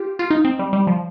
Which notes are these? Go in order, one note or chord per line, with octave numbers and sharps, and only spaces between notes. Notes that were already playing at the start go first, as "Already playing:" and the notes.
Already playing: F4 G4
F4
D#4
C4
G3
G3
F3